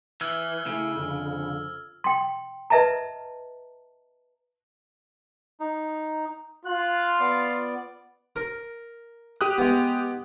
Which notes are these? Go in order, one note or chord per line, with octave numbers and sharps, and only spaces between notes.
E3 E6 F6 G#6
C#3 A3 E4
F2 D3
G5 C6
B4 D#5 E5 A5 A#5
D#4
F4 F#6
B3 D5
A#4
G4 D#6 F#6
G#3 B3